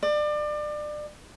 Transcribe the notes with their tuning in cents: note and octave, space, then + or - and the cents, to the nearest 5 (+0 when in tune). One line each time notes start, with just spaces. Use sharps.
D5 +30